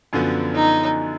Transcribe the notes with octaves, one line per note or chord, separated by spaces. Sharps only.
F#2 D3 F3 B3
D#4